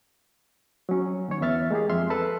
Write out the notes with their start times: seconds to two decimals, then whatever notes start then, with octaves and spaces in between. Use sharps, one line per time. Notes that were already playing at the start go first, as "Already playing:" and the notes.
0.89 F#3 C#4
1.28 D#2 C#5
1.41 E2 B3 E5 F6 A6
1.71 G#3 A#3 G4 G#4
1.90 F2 E5 C6 F6
2.10 A4 B4 A5 C6 E6 F#6